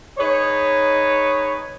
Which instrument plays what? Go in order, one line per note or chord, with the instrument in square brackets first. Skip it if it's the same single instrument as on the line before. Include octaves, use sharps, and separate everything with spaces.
[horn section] D#4 G#4 B4 C#5